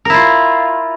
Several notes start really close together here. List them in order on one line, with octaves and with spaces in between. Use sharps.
A#4 E4 F4